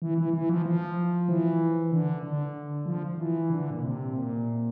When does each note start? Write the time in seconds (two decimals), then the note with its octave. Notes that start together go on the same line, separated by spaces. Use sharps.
0.02 E3
0.18 E3
0.33 E3
0.49 F3
0.66 F3
1.29 E3
1.92 D3
2.23 D3
2.86 F3
3.18 E3
3.50 D3
3.70 A#2
3.81 C3
4.13 A#2